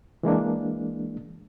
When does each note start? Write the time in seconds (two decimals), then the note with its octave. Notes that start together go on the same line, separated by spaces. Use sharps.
0.23 E3 G#3 A#3 D4